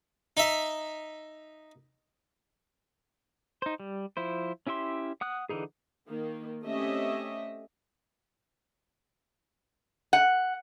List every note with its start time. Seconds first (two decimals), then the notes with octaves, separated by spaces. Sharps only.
0.37 D#4 E5
3.62 D#4 C5
3.80 G3
4.17 F3 E4 C5
4.67 C#4 E4 G4 E5 C6
5.21 F#5 D#6 F#6
5.49 D3 E3 D#4 G#4
6.09 D#3 A#3
6.63 A3 C4 C#4 G4 D#5 E5
10.13 F#5